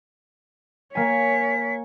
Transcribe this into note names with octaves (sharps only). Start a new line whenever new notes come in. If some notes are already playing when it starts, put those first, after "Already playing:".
A#3 C#5 G#5 B6